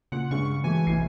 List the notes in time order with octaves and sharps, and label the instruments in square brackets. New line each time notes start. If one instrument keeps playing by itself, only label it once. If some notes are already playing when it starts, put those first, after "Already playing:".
[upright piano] A#2 C#7 [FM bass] C#3 [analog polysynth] F#5
[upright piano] G2 G#3 [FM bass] C#3 [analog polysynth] C#6
[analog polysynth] E3 G#5 [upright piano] F#3 G#3 A3
[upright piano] F1 A2 C7 [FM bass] A#1